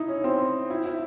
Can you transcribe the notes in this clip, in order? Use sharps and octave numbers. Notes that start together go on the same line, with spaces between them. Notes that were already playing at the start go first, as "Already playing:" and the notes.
Already playing: D#4 E4
C#4
C4
E4
E4